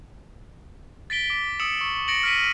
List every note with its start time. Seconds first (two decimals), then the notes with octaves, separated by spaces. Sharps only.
1.10 A6 B6 D7 G7
1.30 D6
1.60 D#6 E6 C#7 D7 E7 F#7
1.81 C#6
2.08 A6 A#6 C#7 D7 F#7
2.23 F6 A#6 B6 D7 D#7